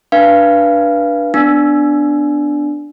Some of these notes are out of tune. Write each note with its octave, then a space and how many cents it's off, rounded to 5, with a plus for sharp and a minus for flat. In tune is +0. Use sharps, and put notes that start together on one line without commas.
D4 +0 B4 -20 F5 -30
B3 +20 D4 +0